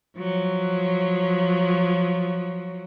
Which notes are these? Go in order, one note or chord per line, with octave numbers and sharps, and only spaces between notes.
F3 F#3